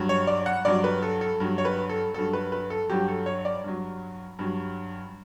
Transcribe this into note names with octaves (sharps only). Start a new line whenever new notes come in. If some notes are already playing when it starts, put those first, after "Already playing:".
Already playing: G2 F#3
C#5
D5
F#5
G2 F#3 D5
B4
A4
A4
G2 F#3
C#5
B4
A4
G2 F#3 A4
B4
B4
A4
G2 F#3 G4
A4
C#5
D5
G2 F#3
G2 F#3